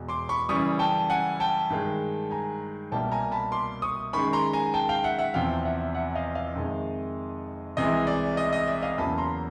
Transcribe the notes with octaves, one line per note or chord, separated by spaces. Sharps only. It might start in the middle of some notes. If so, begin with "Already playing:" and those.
Already playing: E2 B2 G#3
C6 D6
B5 C#6
F#2 C#3 E3 G3 C#6 D#6
G5 A5
F#5 G#5
G5 A5
G2 D#3 G#3
G#5 A#5
C2 B2 G3 A#3 G5 A5
G#5 A#5
A5 B5
C6 D6
C#6 D#6
F#2 D#3 G#3 B5 C#6
A#5 C6
G#5 A#5
G5 A5
F5 G5
E5 F#5
E5 F#5
E2 C3 F3 F5 G5
E5 F#5
E5 F#5
D#5 F5
D#5 F5
F2 C3 D#3 G#3
C2 C3 E3 G#3 D#5
D5
D#5
D#5
D5 E5
D#5 F5
E2 C#3 F#3 A#3 A5 B5
A#5 C6